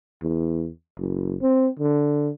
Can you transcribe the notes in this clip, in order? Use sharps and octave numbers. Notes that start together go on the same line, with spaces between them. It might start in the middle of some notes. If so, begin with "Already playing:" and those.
E2
F#1
C4
D3